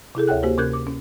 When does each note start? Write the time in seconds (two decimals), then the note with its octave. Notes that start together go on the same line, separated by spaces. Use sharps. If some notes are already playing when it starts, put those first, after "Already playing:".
0.15 C3 E4 G#4 A4
0.28 D2 C#5 F#5 G5 F#6
0.43 A#3 F#4 G4 C5
0.58 C3 C#4 A#4 F#6 G6
0.73 D6
0.87 C#4